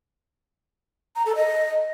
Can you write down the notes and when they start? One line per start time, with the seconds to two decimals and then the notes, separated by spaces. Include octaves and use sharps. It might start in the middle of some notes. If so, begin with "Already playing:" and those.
1.16 A#5
1.26 A4
1.36 D#5